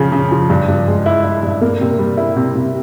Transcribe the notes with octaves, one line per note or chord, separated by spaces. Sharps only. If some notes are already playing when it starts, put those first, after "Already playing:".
Already playing: C#3 F3
C#3
F3
G2
G2
G#3
E4
E4
G2
A#3
C3
G3
E4
C3
C3